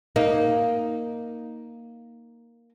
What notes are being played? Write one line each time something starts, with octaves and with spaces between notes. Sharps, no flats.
A#3 D#4